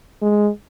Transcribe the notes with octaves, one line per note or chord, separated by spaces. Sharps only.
G#3